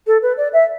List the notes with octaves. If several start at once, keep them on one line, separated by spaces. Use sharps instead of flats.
A4
B4
D5
E5